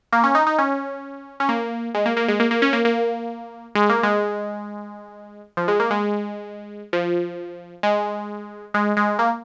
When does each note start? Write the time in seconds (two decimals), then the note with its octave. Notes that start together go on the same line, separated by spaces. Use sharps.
0.13 A#3
0.24 C#4
0.35 D#4
0.47 D#4
0.58 C#4
1.40 C#4
1.49 A#3
1.94 G#3
2.06 A#3
2.17 A#3
2.28 G#3
2.40 A#3
2.51 A#3
2.62 C#4
2.73 A#3
2.85 A#3
3.75 G#3
3.89 A#3
4.03 G#3
5.57 F3
5.68 G#3
5.80 A#3
5.91 G#3
6.93 F3
7.83 G#3
8.74 G#3
8.97 G#3
9.19 A#3